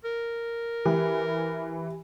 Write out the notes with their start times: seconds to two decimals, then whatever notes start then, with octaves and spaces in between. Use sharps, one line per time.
0.05 A#4
0.85 E3 G4